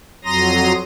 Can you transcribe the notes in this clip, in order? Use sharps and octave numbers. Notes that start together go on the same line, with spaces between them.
F2 F#3 A#5 C6 D#6 A#6